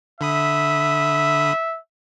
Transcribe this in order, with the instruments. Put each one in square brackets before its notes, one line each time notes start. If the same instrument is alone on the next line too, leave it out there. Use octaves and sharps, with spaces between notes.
[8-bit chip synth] D3 B5 D#6 [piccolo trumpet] E5